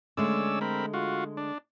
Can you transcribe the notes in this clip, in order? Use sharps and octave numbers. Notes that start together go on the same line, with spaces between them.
D3 G#3 A3 C#4 D5 E6
C4 A#4 B5
F4 F#4
D4